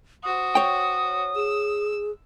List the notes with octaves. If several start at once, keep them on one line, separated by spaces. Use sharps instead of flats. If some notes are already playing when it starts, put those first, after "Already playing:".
F#4 C5 D#6
C#5 G5
G#4 E6